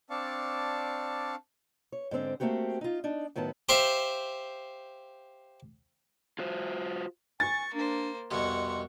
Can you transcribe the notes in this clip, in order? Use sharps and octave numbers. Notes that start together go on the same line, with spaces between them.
C4 D4 D5 F5 A5 C#6
C#5
G#2 D3 C4 D5
A3 A#3 C4 F#4 G4
D#4 F4
D4 D#4
A2 D#3 F#3 B3 C#4 A5
G4 C5 E5 F5
F4 F#4 C5
G#5 C#6 A6
A#3 D4 C5
C2 F2 B2 F#5 C6 C#6